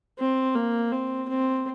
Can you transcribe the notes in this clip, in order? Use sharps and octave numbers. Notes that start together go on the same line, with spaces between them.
C4
A#3
C4
C4